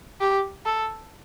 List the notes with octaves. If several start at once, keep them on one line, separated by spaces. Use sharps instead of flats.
G4
A4